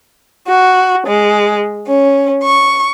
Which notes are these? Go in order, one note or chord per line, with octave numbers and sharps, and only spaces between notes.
F#4
G#3
C#4
C#6